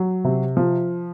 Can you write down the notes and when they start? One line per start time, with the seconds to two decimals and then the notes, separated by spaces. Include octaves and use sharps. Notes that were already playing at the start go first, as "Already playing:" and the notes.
Already playing: F#3
0.24 C3
0.57 F3